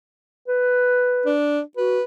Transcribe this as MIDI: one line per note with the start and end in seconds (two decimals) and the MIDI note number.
0.48 1.32 71
1.26 1.61 62
1.77 1.99 66
1.77 2.03 71